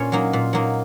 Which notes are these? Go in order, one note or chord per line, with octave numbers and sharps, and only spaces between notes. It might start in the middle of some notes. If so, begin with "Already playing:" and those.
Already playing: A#2 C#4 C#5
F#3 A#3 D#4
A#2
F#3 A#3 D#4